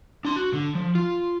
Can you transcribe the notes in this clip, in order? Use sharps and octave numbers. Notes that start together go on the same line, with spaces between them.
D4 C6
F#4
D3
F3
F4